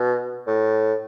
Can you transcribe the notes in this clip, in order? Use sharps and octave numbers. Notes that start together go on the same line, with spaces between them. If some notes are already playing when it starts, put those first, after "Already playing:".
Already playing: B2
A2